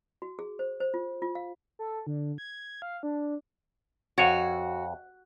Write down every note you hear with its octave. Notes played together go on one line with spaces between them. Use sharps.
F#4
G#4
C5
C5
F4
F4
F5
A4
D3
G#6
F5
D4
F2 F#4 C#5